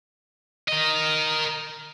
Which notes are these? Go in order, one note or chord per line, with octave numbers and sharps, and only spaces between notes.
A#4 D#5